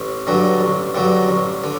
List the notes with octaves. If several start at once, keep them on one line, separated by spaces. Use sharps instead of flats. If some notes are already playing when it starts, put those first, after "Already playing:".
Already playing: A1
G2 D3 F#3
A1
G2 D3 F#3
A1
D3